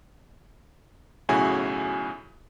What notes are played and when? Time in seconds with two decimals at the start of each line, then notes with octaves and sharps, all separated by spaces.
1.29 B1 A2 C#3 E4 F#4 G#5